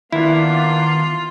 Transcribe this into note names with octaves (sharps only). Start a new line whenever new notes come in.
D#3 A#3 B3 D4 E4 F4